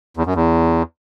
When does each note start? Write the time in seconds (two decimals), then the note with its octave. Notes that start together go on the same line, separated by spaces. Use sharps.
0.17 E2
0.26 F#2
0.35 E2